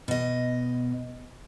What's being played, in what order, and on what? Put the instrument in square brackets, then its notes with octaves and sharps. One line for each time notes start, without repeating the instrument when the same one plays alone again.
[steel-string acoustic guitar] B2 D#5